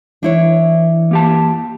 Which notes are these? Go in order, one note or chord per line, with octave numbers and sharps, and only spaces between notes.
E3 D4 E4 C#5
A#3 G4 A5